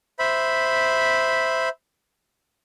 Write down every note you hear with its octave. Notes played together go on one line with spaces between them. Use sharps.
C5 E5 B5